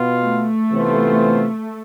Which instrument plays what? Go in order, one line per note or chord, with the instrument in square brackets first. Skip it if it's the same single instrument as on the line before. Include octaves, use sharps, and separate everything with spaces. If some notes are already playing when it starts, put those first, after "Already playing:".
Already playing: [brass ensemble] B2 B3 F4
[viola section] A3
[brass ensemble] C3 E3 B3 F4 C5